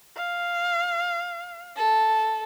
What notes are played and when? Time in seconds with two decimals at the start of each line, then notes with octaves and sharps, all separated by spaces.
0.17 F5
1.77 A4